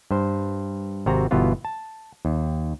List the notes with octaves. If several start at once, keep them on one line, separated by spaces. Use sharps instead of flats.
G2 C5
G#1 C3 C4 F#4 A#5
G1 B2 E3 B3 F4
A5
D#2